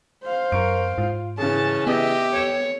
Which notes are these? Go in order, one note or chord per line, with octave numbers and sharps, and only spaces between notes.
C5 F5
F#2 A#4 C#6 D7
G#2 F4
C#3 E3 C#4 G#4 A5
B3 G4 D#5 E5
A4 C#5 E7